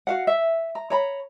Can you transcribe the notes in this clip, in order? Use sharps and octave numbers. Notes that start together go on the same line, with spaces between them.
F#4 F5 F#5
E5
A#5
C#5 A#5 B5